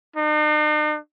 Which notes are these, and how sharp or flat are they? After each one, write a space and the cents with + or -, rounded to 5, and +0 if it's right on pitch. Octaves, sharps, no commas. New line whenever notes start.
D#4 -45